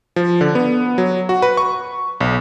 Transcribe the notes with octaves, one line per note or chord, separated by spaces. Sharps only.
F3
D3
B3
F#3
F#4
B4
C#6
B1